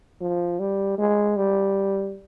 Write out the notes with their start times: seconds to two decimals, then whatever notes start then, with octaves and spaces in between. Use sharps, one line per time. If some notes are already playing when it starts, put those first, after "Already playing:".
0.21 F3
0.60 G3
0.98 G#3
1.37 G3